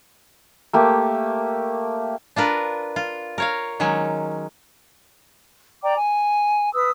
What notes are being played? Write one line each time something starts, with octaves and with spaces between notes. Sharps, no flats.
A3 A#3 G4
D4 F4 A#4 B4
F4
A#4 C#5 F5
D#3 F#3 G#3 C#4
D5 G5 A#5 D6
G#5
B4 D#6 E6